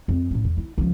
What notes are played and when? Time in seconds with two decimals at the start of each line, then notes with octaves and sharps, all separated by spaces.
0.08 F2
0.31 A2 C#4
0.44 E2
0.57 E4
0.78 C#2 F3